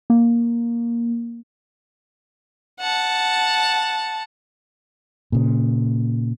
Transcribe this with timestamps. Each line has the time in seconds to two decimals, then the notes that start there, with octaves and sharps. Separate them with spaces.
0.10 A#3
2.80 F#5 A5
5.32 A#2 C#3